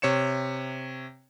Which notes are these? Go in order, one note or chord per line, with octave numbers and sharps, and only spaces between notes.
C3 C#5 C#7 E7